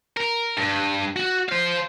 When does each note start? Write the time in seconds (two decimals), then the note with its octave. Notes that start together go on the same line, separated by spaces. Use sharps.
0.17 A#4
0.57 G2
1.16 F#4
1.49 C5 F5